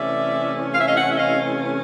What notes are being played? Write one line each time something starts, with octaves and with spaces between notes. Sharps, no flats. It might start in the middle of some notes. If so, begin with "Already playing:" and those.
Already playing: C3 E3 A3 C#4 D5 E5
F5
E5
D#5 F5
E5 F#5
E5
D#5 F5